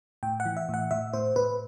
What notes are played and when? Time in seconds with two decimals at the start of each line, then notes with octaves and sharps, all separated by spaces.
0.23 A2 G5
0.40 F#5
0.45 E3
0.57 E5
0.69 A2 F#5
0.91 A2 E5
1.13 A2 C5
1.36 A2 B4